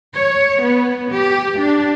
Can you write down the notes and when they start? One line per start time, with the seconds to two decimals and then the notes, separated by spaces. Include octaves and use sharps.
0.13 C#5
0.61 B3
1.11 G4
1.58 D4